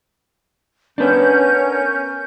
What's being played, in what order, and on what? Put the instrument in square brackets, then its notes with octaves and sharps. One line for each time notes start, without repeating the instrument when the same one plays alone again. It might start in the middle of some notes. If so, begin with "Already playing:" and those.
[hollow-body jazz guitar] B3 D4 [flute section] C#4 A#4 G6